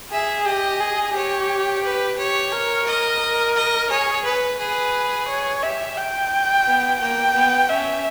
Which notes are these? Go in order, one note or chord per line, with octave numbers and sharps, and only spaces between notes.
G#4 E5
G4 D#5
G#4
G4 C#5
B4
G4 C#5
A#4
D#5
A#4
D#5
G#4 C#5
B4
G#4 B4
C#5
G4 E5
G5
B3
A#3 G5
B3
C#4 E5